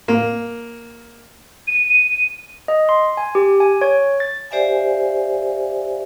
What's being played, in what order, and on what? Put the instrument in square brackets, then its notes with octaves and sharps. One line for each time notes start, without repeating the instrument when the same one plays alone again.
[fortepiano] A#3
[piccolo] D#7
[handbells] D#5
C6
G#5
G4
G#5
C#5
A6
[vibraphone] G4 C5 D5 E5 F5 G#5